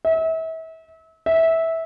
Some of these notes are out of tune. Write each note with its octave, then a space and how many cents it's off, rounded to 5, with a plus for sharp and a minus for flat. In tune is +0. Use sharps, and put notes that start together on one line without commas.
E5 -35
E5 -15